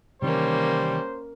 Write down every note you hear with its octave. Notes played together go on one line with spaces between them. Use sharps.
C3 D#3 E3 G3 A#3 C#4 C5